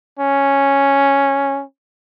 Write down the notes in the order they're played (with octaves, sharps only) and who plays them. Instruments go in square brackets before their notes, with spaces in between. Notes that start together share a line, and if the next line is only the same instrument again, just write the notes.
[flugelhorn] C#4